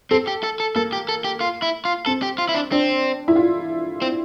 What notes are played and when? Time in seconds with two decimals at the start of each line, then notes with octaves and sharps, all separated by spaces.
0.11 C4 A4
0.27 G4
0.43 A4
0.60 A4
0.75 A#3 A4
0.93 G4
1.09 A4
1.24 G4
1.41 F4
1.62 E4
1.85 F4
2.06 C4 A4
2.23 G4
2.38 F4
2.49 E4
2.54 D4
2.72 C4 D4
3.28 E4
3.36 F4
4.02 C4